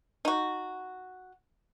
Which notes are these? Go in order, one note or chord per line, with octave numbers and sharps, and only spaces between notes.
D#4 F#4